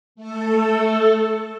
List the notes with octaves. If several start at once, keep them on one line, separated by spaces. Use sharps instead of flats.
A3 A4